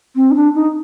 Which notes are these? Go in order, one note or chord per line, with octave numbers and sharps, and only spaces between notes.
C4
D#4
D4
D#4